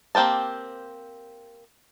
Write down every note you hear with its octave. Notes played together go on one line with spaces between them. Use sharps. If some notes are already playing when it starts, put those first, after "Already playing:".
A#3 C4 G4 C5 A5